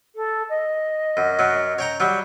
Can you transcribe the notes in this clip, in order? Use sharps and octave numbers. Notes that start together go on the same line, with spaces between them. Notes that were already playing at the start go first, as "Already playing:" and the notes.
A4
D#5
F#2
F#2 F#3
C#5 G5 A#5
F#3 G3